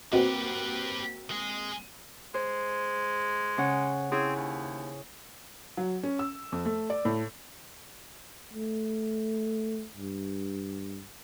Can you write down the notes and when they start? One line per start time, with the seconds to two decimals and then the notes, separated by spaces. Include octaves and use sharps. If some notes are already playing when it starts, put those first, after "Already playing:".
0.13 B2 A#3 C4 F#4 G4 B4
1.31 G#3 G#4
2.34 G#3 C5
3.57 C#3 C#4 F#5
4.12 C4 C#4 E4 G#4
4.36 D#2
5.77 F#3
6.03 C#4
6.19 E6
6.52 F2
6.65 A3
6.90 D5
7.05 A2
8.54 A3
9.97 G2